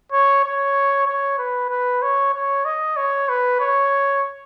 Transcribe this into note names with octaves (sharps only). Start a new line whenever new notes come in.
C#5
C#5
C#5
B4
B4
C#5
C#5
D#5
C#5
B4
C#5